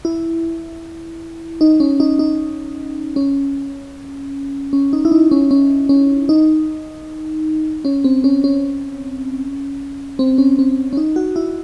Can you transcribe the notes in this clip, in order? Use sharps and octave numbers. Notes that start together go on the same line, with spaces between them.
E4
D#4
C#4
D#4
D#4
C#4
C#4
D#4
E4
D#4
C#4
C#4
C#4
D#4
C#4
C4
C#4
C#4
C4
C#4
C4
C#4
D#4
F#4
E4